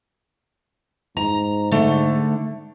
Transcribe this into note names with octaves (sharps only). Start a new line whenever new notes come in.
G#2 A#5
D3 A3